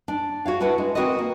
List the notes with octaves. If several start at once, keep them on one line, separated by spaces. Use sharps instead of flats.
D4
F#4 C#5 F5
D4 E4 F#4 B4 F#5
G#3
C4 C#4 F#4 A#4 B4 D#5
A#3